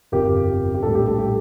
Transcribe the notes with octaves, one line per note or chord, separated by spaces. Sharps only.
G1 F2 C3 F3 G4 A#4
G4
A#1 A2 G3 A4
G4
A4
G4